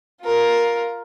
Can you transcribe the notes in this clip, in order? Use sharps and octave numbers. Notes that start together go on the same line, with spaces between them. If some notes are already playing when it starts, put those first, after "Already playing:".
F4 A#4